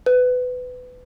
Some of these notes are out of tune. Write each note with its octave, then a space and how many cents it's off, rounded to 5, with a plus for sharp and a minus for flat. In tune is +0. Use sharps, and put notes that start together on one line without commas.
B4 +20